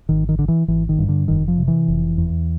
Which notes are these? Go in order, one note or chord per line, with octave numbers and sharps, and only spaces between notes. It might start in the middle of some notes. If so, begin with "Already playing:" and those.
G#1 D#3
D#3
D3
E3
G#1 E3
D#3
G2
D3
F1 D#3
F3
C3
E3
F1
E2